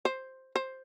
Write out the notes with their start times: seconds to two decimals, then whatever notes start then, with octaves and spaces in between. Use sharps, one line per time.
0.05 C5
0.56 C5